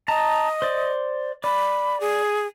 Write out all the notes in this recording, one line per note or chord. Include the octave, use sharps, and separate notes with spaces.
D#5 A5 A#5
C5 D5
D5 B5
G#4